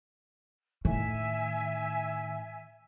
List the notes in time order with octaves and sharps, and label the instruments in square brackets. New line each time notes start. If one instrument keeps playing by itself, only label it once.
[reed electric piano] A2 [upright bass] D#3 [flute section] E5 G#5